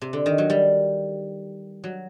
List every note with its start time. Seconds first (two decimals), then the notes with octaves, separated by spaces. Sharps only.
0.01 C3
0.13 D3
0.26 D#3
0.38 F#3
0.50 G3
1.84 F#3